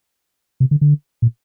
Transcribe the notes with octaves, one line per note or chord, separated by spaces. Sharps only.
C3
D3
D3
A#2